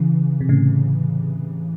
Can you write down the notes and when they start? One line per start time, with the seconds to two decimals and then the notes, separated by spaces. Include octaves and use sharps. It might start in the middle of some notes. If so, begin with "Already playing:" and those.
Already playing: C#3 E3
0.41 C3
0.49 A2 C#3